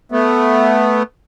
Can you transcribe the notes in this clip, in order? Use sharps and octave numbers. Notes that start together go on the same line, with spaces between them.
A3 B3